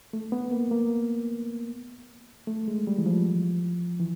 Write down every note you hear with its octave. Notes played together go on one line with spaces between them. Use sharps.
A3
B3
A#3
A#3
A3
G#3
G3
E3
F3
E3